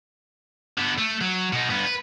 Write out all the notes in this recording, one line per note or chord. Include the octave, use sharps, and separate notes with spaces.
D3 B3
A3
F#3
B2 D#4
G2 B3
B4